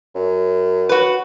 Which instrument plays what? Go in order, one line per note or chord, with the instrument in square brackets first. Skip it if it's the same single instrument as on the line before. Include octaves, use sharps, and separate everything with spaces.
[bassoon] F#2
[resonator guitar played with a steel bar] F#4 B4